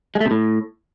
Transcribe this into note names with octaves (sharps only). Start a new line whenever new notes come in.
G#3
A3
C3
A2